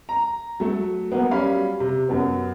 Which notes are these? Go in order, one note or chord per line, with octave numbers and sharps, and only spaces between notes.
A#5
F#3 A3
F#3 A#3 B3
F#3 G3 C#4 F5 B5
C3
F#2 F#3 B3